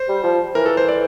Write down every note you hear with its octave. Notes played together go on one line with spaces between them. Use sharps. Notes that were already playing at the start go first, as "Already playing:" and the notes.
Already playing: C5
G3
F3
E3 A#4
A4
C5
D5